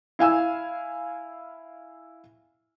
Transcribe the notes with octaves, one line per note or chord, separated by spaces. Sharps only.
E4 F5 G#5 E6